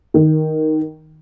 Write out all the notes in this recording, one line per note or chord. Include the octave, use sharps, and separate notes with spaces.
D#3